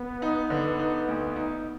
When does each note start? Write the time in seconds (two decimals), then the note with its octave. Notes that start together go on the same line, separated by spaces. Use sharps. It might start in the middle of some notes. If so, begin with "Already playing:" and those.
Already playing: B3
0.22 D#4
0.50 D3
0.79 D#4
1.08 D2
1.36 D#4